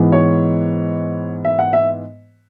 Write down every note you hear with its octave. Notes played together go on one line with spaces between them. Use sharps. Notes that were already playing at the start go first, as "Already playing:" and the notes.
Already playing: G#2 E3 G#3 B3
C#5
E5
F#5
E5